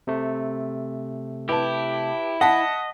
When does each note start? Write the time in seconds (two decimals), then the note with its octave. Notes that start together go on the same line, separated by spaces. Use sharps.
0.07 C3 A3
1.49 E4 G4 B4 A5
2.41 D#5 F#5 A5 B6